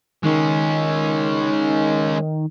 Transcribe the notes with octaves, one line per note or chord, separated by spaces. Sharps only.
D#3 G#3 C#4